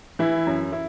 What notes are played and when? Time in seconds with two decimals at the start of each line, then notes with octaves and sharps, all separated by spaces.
0.19 E3 E4
0.47 F#2
0.72 E4